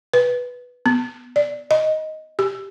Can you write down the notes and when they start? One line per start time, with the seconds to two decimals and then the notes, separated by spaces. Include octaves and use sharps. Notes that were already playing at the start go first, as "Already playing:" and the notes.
0.14 B4
0.86 B3
1.36 D5
1.71 D#5
2.39 G4